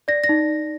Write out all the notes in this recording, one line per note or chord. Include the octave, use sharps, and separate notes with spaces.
D5 A#6
A#6
D#4